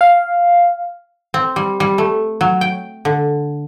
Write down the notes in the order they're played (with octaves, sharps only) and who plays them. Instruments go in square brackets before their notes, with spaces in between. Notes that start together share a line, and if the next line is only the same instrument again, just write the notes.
[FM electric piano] F5
[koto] C4
G3
G3
A3
F#3
G5
D3